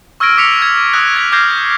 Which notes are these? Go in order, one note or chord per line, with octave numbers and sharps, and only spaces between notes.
C#6 E6 F6 G#6 A#6 D7
D6 B6 C#7 F7
G#6
C#6 D#6 E6 F#6 A#6
G#6 B6
D6 F6 G6 G#6 A#6 C7